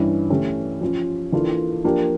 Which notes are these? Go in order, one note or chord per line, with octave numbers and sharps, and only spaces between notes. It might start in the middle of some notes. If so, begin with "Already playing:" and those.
Already playing: G2 E3 G3 C#4 E4
E3 A3 C#4 G4
F3 C#4 F4
E3 A#3 D4 F4 A4
F3 A#3 D4 G4